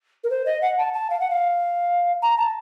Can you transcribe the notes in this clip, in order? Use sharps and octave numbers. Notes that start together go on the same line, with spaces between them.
A#4
C5
D#5
F#5
A5
A5
F5
F#5
F5
A#5
A5